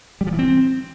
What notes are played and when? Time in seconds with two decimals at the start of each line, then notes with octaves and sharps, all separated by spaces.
0.21 G3
0.27 F3
0.33 E3
0.39 C4